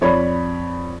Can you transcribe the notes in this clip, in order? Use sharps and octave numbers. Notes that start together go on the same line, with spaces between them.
F2 C#5 D5 B5